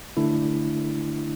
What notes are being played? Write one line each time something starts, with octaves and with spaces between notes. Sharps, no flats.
D3 A3 D4 E4